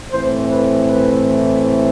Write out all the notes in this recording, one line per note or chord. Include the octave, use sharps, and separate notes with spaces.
A2 E3 A3 C4 C5
B4
B4